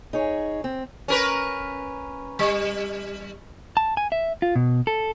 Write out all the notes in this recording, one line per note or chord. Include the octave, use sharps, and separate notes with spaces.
D#4 G#4 C#5
C4
C#4 A#4 B4
G3
A5
G#5
E5
F4
B2
A4